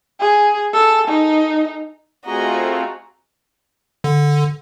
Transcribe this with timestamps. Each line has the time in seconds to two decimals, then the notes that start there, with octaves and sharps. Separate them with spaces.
0.20 G#4
0.73 A4
1.08 D#4
2.26 A3 C4 F4 F#4 G#4 D#5 A#5
4.04 D3